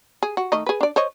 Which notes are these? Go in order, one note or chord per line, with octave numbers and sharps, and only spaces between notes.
G#4
F#4
D#3 A3 D#5
G#4 B4
D4 D5
C5 C#5 D#5